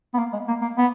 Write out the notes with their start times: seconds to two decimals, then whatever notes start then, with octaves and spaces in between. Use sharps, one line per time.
0.14 B3
0.19 A#3
0.33 G#3
0.48 A#3
0.62 A#3
0.77 B3